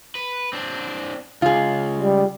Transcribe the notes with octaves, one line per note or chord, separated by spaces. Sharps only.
B4
C4 D4
C#2 F4 G#4
G3